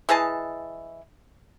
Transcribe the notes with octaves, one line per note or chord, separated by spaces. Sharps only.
E3 G#4 D#5 A5